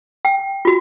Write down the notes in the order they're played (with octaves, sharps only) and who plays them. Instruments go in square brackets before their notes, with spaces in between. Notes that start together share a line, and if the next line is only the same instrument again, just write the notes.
[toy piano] G5
F4 F#4